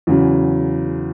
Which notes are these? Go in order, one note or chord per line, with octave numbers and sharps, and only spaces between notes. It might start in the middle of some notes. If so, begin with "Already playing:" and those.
E2 C#3 F#3